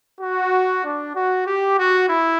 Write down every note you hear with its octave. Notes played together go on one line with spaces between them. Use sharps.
F#4
D4
F#4
G4
F#4
E4